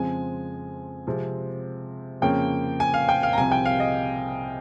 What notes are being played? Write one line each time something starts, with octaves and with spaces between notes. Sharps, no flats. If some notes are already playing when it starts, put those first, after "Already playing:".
Already playing: F2 C#3 F3 G#3 C4 G#5
C3 F3 G#3 C4
F2 C#3 F3 A#3 C#4 G5
G#5
F5
G5
F5
A#5
C2 C3 F3 G#5
G5
F5
D#5